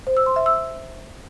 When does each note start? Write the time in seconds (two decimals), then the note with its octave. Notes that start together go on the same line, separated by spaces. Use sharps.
0.07 C5
0.17 E6
0.26 C6
0.36 E5
0.46 E6